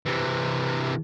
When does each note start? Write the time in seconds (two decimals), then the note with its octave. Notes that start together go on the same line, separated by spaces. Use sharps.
0.06 C3 E3